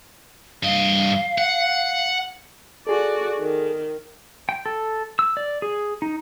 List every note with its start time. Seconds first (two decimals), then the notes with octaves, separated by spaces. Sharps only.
0.63 G2 D#5 F5
1.38 F#5
2.87 F#4 G#4 A4 D5
3.40 D#3
4.49 G5
4.66 A4
5.19 E6
5.37 D5
5.62 G#4
6.02 D#4